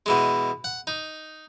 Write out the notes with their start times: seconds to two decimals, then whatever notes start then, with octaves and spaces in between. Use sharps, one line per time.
0.06 B2 E3 G#3
0.64 F#5
0.87 D#4